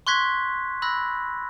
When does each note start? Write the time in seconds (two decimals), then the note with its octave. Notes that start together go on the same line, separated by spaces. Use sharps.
0.07 C6 C#6 F#6 G#6 B6
0.82 B5 E6 F#6 A#6